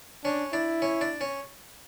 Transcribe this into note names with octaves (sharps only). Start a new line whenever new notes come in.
C#4 D4
D4 E4
C#4
D4
C#4